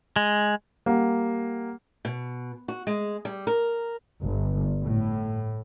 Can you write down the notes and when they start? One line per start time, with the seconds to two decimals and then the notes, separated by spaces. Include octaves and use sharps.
0.16 G#3
0.86 G3 A#3 F#5
2.05 B2
2.68 F#4
2.87 G#3
3.25 G3
3.47 A#4
4.22 G1
4.83 A2